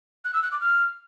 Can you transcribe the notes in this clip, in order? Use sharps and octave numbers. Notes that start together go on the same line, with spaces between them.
F#6
E6
F#6
D6
F6